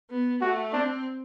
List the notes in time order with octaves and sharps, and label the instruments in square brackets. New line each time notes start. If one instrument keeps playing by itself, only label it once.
[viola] B3
[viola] A3 [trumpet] F#4
[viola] C4 [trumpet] D4